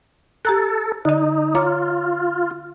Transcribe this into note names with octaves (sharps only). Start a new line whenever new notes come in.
G4 A4 A#5 F#6
D3 D#4 D#5
F4 C#5 A#5 D6